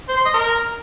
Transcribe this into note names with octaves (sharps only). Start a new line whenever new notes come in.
C5
C6
D#5
A#4